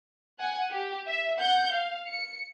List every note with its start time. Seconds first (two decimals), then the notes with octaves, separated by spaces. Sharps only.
0.40 F#5 G#5
0.71 G4
1.07 E5
1.40 F#5 G6
1.73 F5
2.08 C#7